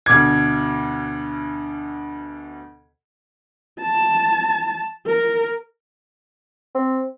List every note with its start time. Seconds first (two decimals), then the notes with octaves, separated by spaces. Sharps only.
0.06 D2 B2 D6 G#6
3.80 A5
5.06 A#4
6.75 C4